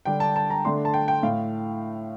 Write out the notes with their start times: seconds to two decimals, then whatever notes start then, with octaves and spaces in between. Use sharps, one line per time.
0.05 D3 G3 D4 G5
0.20 A5
0.36 A5
0.50 A#5
0.65 D3 A3 D4 C6
0.85 A5
0.94 G5
1.08 G5
1.23 A2 F5